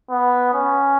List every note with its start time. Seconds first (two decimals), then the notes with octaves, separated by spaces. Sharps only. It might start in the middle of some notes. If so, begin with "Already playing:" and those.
0.10 B3
0.54 C#4